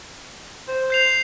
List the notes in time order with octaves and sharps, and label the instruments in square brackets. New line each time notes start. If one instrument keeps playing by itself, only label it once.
[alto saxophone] C5
[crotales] G6 C7 F7